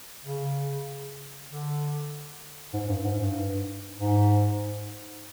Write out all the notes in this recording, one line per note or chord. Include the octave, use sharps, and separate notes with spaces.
C#3
D3
G#2
G2
G#2
G2
G#2